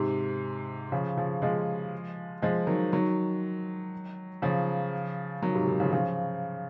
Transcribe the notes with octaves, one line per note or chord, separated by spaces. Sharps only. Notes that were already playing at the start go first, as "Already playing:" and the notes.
Already playing: G#2 C3
C#3 F3
C#3 F3
F3 G#3
F3 G#3
D#3 F#3
D#3 F#3
C#3 F3
D#3 F#3
G#2 C3
C3 D#3
C#3 F3
C#3 F3